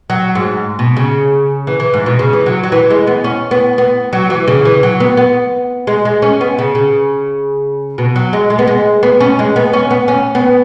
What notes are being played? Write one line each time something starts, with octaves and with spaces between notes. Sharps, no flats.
F#3
G#2
B2
C#3
E3
E3
G#2
B2
C#3
E3
F#3
F#3
E3
G#3
B3
C#4
B3
B3
F#3
E3
C#3
E3
F#3
B3
B3
G#3
G#3
C#4
B3
C#3
C#3
B2
F#3
G#3
G#3
B3
G#3
B3
C#4
G#3
B3
C#4
B3
C#4
B3